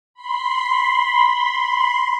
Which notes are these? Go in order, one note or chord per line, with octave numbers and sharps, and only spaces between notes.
B5 C6